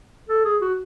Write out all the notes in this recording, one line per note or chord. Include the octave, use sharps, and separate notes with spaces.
A4
G#4
F#4